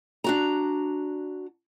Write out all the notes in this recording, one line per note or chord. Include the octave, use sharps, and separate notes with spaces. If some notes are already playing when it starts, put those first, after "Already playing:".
D4 F#4 A#5